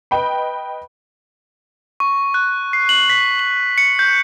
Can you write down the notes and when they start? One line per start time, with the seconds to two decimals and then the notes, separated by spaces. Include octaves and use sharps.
0.11 B4 D#5 G5 B5
2.00 C#6
2.34 F#6
2.73 C7
2.89 F#7
3.10 B6
3.39 F#7
3.78 C#7
3.99 G6